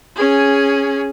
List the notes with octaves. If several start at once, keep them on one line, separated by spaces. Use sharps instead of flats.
C#4 G#4